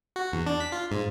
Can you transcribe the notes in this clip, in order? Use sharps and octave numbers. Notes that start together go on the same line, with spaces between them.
F#4
E2
D4
B6
F4
G#2